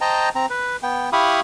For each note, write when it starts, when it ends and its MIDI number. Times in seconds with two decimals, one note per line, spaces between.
0.01 0.29 72
0.01 0.29 75
0.01 0.29 79
0.01 0.29 81
0.01 0.29 82
0.35 0.46 60
0.35 0.46 82
0.50 0.76 71
0.83 1.10 59
0.83 1.10 79
1.13 1.41 64
1.13 1.41 67
1.13 1.41 77
1.13 1.41 83
1.13 1.41 85
1.13 1.41 87